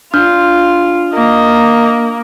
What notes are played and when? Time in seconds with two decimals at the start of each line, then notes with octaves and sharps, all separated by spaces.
0.14 D4 F4 F6
1.14 A#3 D#5